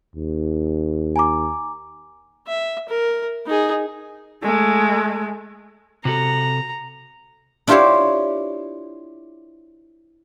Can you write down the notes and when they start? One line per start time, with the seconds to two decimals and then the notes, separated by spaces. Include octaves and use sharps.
0.16 D#2
1.16 G#5 A#5 D6
2.47 E5
2.89 A#4
3.47 D#4 G#4
4.43 G#3 A3
6.05 C3 F#4 A4 A#5
7.67 D4 E4 F4 G4 C5 C#5